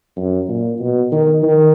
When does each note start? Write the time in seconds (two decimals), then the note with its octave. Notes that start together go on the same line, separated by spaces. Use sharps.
0.16 F#2
0.48 A#2
0.80 B2
1.12 D#3
1.43 D#3